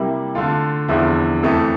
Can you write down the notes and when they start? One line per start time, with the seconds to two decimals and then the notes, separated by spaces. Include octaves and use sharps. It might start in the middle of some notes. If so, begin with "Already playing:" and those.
Already playing: C3 G3 A#3 E4
0.35 D3 A3 D4 F4
0.88 E2 D3 F3 C4 E4
1.43 F2 E3 A3